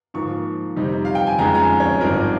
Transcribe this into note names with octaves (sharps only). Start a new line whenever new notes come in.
G#2 F3 A#3 C#6
F2 C3 G3 C4 D#4
F5
G5
G#5
F2 C#3 G#3 D#4 A#5
A#5
G#5
C#5
G#1 G2 F3 C4 D#4 A#4